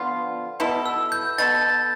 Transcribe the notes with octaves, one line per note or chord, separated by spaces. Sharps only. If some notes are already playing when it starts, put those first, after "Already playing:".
Already playing: D3 F3 B3 F4
B2 B3 E4 A4
E6
G6
B2 B3 E4 A4 A6